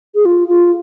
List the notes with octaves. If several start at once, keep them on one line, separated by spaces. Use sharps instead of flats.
G#4
F4
F4